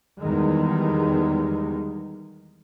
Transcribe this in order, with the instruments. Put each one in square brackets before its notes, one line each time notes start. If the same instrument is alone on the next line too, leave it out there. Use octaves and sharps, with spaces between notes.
[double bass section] E2 D#3 G3 G#3